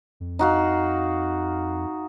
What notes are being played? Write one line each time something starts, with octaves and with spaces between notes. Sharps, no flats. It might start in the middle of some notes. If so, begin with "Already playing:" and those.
F2
D#4 F#4 F5